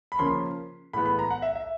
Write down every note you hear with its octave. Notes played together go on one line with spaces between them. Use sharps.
B5
C#3 F3 A#3 C#4 C6
A2 E3 G#3 B3 B5
B5
A#5
F#5
E5
E5